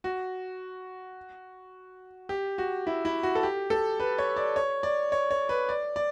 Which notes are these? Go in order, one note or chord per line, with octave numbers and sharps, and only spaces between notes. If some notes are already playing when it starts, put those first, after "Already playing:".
F#4
G4
F#4
E4
E4
F#4
A4
G4
A4
B4
C#5
D5
C#5
D5
C#5
C#5
B4
D5
D5